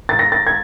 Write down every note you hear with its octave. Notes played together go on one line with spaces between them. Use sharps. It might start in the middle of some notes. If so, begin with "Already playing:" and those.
A6
A#6
A6
G#6